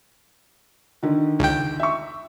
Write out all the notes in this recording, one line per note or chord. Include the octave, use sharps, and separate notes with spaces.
D3 D#3
C#2 G5
E5 C#6